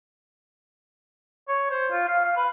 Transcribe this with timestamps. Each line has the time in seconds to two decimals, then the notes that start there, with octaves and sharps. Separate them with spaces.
1.48 C#5
1.71 C5
1.91 F4
2.08 F5
2.25 F5
2.37 B4